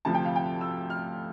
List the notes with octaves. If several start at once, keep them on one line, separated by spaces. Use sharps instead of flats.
D2 C3 F3 A5
G5
F5
G5
E6
F6